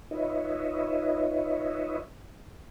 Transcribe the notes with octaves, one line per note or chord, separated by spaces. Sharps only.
D#4 F4 B4 C#5 D#5 E5